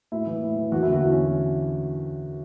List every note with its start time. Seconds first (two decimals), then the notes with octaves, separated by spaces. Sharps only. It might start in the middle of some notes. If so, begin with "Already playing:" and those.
0.12 A2 E4
0.27 E3
0.42 A2
0.57 E3
0.72 E2 F#4
0.83 E4
0.88 D3 F#4
1.03 E2 E4
1.12 C#4